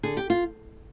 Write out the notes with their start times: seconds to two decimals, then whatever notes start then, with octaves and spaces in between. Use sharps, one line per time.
0.03 D3 G#4
0.17 G4
0.30 F4